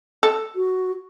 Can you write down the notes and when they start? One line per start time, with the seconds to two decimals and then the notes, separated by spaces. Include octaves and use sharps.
0.23 A4
0.56 F#4